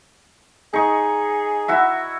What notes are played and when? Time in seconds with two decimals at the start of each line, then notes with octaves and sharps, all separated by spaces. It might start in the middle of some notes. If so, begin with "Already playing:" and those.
0.74 D#4 G#4 C#6
1.68 E4 F#4 E5